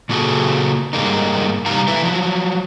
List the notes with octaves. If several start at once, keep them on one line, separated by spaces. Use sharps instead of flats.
A#2 C#3 A#3 F#4 G#4 A4
G2 G#3 A#3 D#4
C3 G3 D#4 G4 F5 A#5
A3 E4 B4 E5
F3 F#3